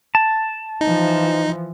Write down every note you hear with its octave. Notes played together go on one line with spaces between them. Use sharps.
A5
E3 F3 D#4